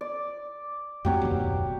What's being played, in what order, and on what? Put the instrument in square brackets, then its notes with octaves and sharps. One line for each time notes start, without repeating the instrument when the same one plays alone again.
[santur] D5
[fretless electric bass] F2 A3 C4 [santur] F#3 G4
[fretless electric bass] F#1 D#2 B2